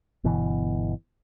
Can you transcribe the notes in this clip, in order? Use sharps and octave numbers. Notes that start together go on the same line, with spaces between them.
G1 B2 E3